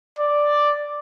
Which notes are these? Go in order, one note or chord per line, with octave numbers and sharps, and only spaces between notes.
D5